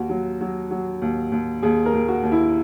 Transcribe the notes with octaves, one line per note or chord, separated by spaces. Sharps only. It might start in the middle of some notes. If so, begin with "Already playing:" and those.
Already playing: D#2 F#4
F#3
F#3
F#3
D#2
D#2
D#2 G#4
A#4
D#2
F#4
D#2
E4